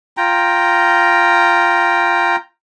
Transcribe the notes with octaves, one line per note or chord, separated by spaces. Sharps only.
F4 G5 A#5